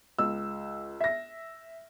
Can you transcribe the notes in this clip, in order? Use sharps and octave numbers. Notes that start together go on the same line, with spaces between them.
C#2 E6
E5 A#6